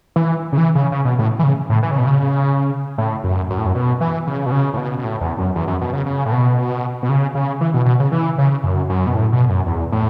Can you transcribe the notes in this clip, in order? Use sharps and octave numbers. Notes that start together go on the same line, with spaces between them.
E3
C#3
E3
C#3
C#3
B2
A2
E3
C#3
A2
E3
C#3
B2
C#3
A2
F#2
F#2
A2
F#2
B2
E3
C#3
B2
C#3
A2
B2
B2
A2
E2
F#2
E2
F#2
B2
C#3
C#3
A2
B2
B2
C#3
C#3
E3
B2
B2
C#3
E3
C#3
F#2
F#2
B2
A2
B2
F#2
E2
A2